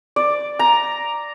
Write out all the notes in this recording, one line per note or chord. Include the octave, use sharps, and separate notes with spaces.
D5
A#5